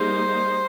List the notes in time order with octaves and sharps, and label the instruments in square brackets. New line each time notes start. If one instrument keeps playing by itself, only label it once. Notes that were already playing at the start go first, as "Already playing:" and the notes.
Already playing: [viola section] G3 A#3 D#4 G#4 [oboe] C5